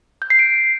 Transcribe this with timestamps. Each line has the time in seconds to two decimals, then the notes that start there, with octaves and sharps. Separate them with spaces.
0.22 G6
0.30 C7
0.39 D7